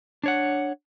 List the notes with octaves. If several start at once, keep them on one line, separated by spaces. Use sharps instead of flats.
D4 C#5 F#5